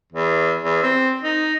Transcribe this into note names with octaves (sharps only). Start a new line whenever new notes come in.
E2
E2
C4
D#4